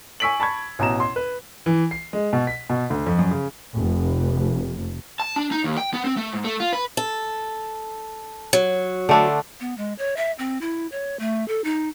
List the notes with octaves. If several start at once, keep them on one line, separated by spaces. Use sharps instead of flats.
G#5 C#6 E6 B6 D7 F#7
A5 B5 C#6 G#6
A1 B2 A#5 E7
C6
B4
E3
C7
G#3
B2
B6
B2
D2
F2
F#2
C#3
F1
A5
D4
D#4
D#2
G5
B3
C4
A3
G#2
A3
F4
B4
A4
F#3
D3 A3 D4
B3
G#3
C#5
E5
C4
E4
C#5
A3
A4
D#4